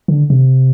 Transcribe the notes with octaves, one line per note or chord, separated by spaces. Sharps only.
D3
C3